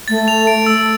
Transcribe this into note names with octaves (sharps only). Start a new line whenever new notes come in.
A3 A6
F7
D7
E6